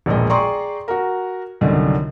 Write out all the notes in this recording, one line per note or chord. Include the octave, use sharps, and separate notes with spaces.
E1 A#1 A#2 D#5
G#4 D5 G5 A#5 C6 C#6
F#4 A#4
C2 F#2 D3 D#3